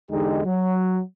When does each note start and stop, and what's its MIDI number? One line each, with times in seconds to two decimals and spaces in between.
0.11 0.40 40
0.11 0.40 50
0.11 0.40 56
0.11 0.40 63
0.11 0.40 67
0.44 1.00 54